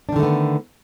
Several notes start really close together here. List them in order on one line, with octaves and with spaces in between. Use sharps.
D4 D#3 D3 A3 B3